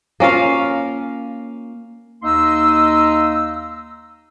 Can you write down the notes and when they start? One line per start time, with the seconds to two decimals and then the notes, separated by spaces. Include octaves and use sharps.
0.20 A#3 C#4 F4 F5
2.23 D#2 A#3 D#4 D#5 C6 E6